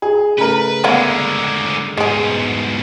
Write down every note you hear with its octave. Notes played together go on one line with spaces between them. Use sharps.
G#4
C#3 A3 A#4 B4
D3 G#3 A#3 B3 E4
G#2 B2 G#3 G#4